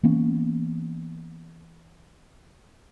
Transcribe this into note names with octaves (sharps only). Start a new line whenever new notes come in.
E3 A#3 B3 C#4